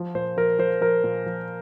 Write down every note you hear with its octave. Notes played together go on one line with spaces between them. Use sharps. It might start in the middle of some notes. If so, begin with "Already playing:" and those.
Already playing: F3
A#2 C5
F3 A#4
F3 C5
F3 A#4
A#2
F3